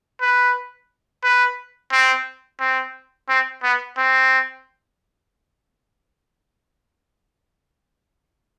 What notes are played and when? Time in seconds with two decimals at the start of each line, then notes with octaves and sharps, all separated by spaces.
0.21 B4
1.24 B4
1.92 C4
2.60 C4
3.29 C4
3.63 B3
3.98 C4